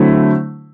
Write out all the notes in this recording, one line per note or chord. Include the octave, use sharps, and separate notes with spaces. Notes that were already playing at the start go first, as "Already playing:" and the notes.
Already playing: D3 F#3 A3 C4 E4